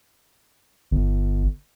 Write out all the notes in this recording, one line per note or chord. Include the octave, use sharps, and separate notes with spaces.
G1